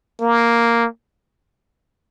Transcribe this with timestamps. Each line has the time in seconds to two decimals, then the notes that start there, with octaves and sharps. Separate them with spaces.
0.21 A#3